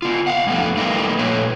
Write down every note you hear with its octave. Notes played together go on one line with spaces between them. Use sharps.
B3 F4
F5 F#5
F2 G3 A3 B3
G3 A3 A#3 D#4 B4
A#2 A3 B4 C#5